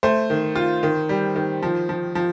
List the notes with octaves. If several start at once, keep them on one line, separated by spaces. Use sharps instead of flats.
A3 C5
D#3
F4
D#3
G3
D#3
F3
F3
F3